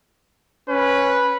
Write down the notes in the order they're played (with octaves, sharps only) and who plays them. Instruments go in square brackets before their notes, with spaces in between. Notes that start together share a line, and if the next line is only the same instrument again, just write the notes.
[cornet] C#4 [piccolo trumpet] B4